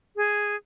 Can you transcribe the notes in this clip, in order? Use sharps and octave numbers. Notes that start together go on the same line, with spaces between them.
G#4